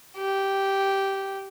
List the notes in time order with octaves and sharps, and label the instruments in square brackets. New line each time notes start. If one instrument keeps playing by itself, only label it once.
[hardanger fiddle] G4